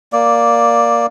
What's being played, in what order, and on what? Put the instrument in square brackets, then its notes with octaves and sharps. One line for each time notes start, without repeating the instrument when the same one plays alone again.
[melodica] A#3 D5